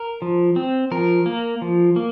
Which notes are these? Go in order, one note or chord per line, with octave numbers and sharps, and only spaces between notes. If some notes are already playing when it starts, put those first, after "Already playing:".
Already playing: A#4
F3
C4
F3 A#4
A#3
F3
A#3